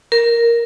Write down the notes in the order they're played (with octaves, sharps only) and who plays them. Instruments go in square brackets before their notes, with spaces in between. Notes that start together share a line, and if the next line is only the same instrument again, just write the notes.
[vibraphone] A#4